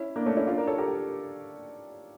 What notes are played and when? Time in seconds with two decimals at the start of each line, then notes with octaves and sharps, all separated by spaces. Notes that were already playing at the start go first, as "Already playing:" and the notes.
Already playing: C#4 E4
0.16 A#3 D4
0.26 A3 C#4
0.37 C#4 E4
0.47 D4 F4
0.58 A#4 D5
0.67 A4 C#5
0.78 G4 A#4